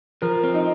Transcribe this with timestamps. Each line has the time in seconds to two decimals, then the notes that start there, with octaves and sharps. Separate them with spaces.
0.22 F3 A#4
0.44 C4
0.54 D#4